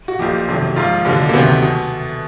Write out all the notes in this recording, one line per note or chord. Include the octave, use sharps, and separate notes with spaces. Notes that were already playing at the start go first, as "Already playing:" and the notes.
F#4
B1 A#2 F3 G4
F#1 F2 C3 D#3 F#3
A#1 G#2 F3 F4
F1 D#2 D3 F#3
A#3
D2 C3 D#3 F#3 B3
B2